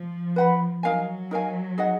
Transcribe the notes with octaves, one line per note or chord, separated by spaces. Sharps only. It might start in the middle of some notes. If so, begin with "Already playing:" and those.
Already playing: F3
B4 F#5 B5
F#3 D#4 A#4 F5 G#5
D#4 A#4 F5 G#5
D#4 G#4 D#5 F#5